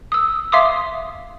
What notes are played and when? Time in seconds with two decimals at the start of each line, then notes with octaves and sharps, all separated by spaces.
0.12 D#6 E6
0.52 E5 F5 C6 D6 D#6